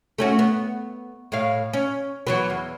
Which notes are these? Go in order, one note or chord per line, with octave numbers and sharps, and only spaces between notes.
A3 C#4 F#4
B3
A2 F5
C#4
E3 F#3 B3
E2